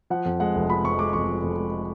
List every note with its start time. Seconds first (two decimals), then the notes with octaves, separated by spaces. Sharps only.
0.10 F3 F#5
0.25 F2
0.40 G#3 F#5
0.55 F1
0.69 F3 B5
0.84 F2 C#6
0.99 G#3 D6
1.13 F1 C#6
1.29 F3
1.43 F2
1.57 G#3